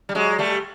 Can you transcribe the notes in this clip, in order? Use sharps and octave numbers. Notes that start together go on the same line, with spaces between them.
G3
F#3 G#3
G3 A3